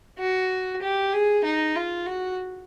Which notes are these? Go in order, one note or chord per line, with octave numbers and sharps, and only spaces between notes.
F#4
G4
G#4
D#4
F4
F#4